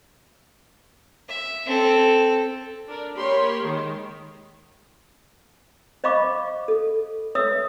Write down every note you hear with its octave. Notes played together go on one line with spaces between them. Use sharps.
E5
C4 A4
D4 A#4 D5
A#3 G4 A#4 C#5 B5 C6
D#3 G#3
C5 D#5 F5 B5 C#6 D6
A4
B4 C#5 E5 D#6 E6